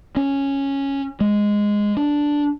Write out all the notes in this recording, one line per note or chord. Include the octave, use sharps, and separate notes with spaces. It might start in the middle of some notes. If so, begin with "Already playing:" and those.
C#4
G#3
D4